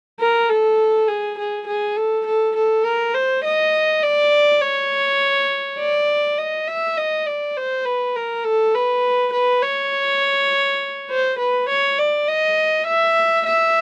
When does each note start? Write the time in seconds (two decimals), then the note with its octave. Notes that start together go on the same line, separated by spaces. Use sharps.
0.20 A#4
0.49 A4
1.08 G#4
1.38 G#4
1.67 G#4
1.96 A4
2.26 A4
2.56 A4
2.85 A#4
3.14 C5
3.44 D#5
4.02 D5
4.62 C#5
5.79 D5
6.38 D#5
6.68 E5
6.97 D#5
7.26 D5
7.57 C5
7.85 B4
8.16 A#4
8.44 A4
8.75 B4
9.33 B4
9.62 C#5
11.10 C5
11.39 B4
11.69 C#5
11.99 D5
12.28 D#5
12.87 E5
13.46 E5